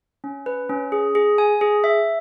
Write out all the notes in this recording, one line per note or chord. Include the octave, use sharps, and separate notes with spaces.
C#4
B4
C#4
G#4
G#4
G#5
G#4
E5